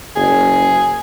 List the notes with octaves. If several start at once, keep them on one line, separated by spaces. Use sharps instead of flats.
F#1 G#4